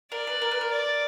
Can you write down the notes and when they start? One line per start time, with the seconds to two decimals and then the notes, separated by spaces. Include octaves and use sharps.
0.12 A#4 D5
0.27 B4
0.42 A#4
0.51 B4
0.61 A#4
0.71 D5